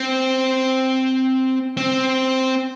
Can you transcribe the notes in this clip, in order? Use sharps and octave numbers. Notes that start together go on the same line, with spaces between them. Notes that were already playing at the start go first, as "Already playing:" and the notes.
Already playing: C4
C4